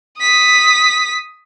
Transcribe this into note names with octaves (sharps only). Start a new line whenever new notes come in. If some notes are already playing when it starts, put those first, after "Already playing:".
D#6 B6